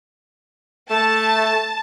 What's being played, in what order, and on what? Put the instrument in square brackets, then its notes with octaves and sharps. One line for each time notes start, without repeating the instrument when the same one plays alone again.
[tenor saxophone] A3 [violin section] A5